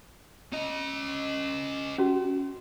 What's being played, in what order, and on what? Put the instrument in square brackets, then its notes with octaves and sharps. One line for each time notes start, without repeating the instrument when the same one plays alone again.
[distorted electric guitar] C#4 D#5
[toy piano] C#4 F#4